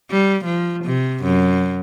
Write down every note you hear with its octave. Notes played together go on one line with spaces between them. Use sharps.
G3
F3
C3
F#2